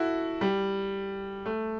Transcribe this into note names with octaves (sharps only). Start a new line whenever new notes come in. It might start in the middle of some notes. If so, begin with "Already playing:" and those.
Already playing: E4 F#4 A4
G3
A3